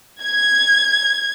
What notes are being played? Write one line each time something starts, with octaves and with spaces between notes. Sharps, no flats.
G#6